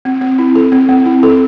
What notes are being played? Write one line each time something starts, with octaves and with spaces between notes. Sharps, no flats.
C4
C4
E4
A4
C4
C4
E4
A4